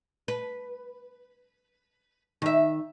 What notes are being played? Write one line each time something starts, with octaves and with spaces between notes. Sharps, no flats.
B4
D#3 E5